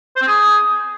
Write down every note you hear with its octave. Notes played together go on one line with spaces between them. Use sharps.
C5
C4
G#4